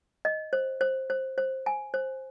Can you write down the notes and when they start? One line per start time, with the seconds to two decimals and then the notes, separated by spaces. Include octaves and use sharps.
0.25 D#5
0.53 C5
0.81 C5
1.10 C5
1.38 C5
1.66 G#5
1.94 C5